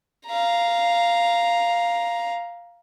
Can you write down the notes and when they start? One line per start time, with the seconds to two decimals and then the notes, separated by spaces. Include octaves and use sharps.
0.27 F5 A#5